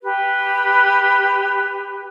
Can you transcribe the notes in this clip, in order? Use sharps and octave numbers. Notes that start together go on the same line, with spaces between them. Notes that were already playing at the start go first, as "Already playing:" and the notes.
G4 B4